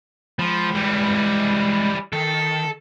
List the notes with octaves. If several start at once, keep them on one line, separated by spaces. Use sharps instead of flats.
F3 G#3 B5
E3 G3
D#3 A4